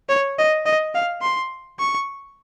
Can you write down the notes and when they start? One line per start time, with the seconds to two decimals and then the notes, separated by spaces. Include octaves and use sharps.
0.09 C#5
0.38 D#5
0.66 D#5
0.94 F5
1.22 C6
1.79 C#6